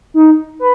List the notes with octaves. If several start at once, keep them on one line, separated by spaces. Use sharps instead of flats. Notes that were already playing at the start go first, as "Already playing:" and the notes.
D#4
B4